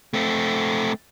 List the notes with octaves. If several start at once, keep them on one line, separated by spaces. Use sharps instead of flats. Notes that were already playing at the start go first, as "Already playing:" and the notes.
A3 C4